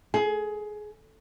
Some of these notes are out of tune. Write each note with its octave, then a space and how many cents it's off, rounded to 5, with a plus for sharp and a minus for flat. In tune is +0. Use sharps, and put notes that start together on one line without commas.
G#4 +20